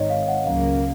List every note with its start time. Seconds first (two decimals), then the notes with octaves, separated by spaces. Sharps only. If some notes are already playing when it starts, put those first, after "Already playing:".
Already playing: G#1 G#2 D#3 C#5 D#5
0.10 F5
0.28 F#5
0.45 C#2 C#3 F#3 A#3 F5